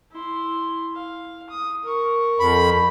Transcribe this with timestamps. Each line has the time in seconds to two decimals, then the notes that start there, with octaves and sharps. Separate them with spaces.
0.12 E4 C6
0.96 F5
1.50 D#6
1.84 A#4 C#6
2.40 F2 B5